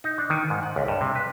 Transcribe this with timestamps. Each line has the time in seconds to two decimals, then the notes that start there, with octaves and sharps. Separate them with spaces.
0.04 D#4
0.18 D4
0.30 D#3
0.50 G#2
0.63 F#5
0.76 C#2
0.88 G2
1.01 C3
1.15 B4